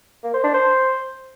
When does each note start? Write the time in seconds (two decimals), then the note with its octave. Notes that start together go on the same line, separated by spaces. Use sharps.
0.23 A#3
0.34 C5
0.44 D4
0.54 C5